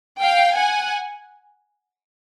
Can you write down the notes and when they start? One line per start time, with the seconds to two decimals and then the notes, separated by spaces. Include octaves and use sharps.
0.20 F5 G5
0.56 F#5 G#5